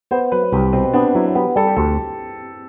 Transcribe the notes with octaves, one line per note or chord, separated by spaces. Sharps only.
B3 C5
F#3 B4
C2 G4
B2 C4
B3 D4
F#3 E4
B3 G4
G3 A4
G4
D2 A4